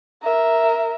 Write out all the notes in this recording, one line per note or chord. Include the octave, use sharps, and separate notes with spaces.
A#4 E5